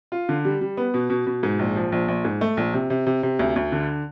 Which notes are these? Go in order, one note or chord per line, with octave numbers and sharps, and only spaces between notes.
F4
D3
G3
G3
B3
B2
B2
B2
G#2
A#1
F3
A#1
A#1
G#2
A3
A#1
C3
C3
C3
C3
D2
D2
D3